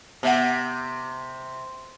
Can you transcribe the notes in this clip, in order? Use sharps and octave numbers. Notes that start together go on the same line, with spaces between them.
C3 B3 E5 F#5